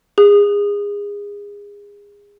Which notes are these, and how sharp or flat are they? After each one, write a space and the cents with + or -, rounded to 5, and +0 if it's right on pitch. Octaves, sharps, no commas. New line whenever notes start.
G#4 -30